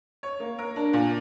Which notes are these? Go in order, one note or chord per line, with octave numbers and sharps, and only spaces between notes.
C#5
A#3
A#4
D4
A#2